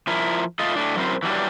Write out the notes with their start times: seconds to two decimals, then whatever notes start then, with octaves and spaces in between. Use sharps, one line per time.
0.07 F3 E4 A#4
0.59 A3 F4 D#5
0.76 A2 A3 D4
0.96 F#2 F#3 C4 E4 A#4 C5
1.23 E3 F#3 G3 D4